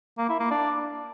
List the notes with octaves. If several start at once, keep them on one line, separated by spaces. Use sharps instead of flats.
A#3
E4
A#3
D4